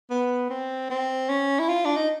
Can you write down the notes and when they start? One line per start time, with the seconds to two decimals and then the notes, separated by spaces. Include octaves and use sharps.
0.11 B3
0.50 C4
0.90 C4
1.29 C#4
1.60 E4
1.69 F4
1.86 D4
1.97 D#4